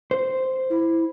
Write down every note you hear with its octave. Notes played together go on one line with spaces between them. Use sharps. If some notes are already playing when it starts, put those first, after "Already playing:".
C5
E4